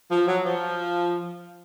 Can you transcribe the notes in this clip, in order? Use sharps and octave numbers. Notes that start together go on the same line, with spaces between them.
F3
F#3
F3